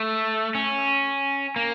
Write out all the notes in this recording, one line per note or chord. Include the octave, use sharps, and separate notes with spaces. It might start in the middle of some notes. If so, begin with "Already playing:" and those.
Already playing: A3
C#4
A#3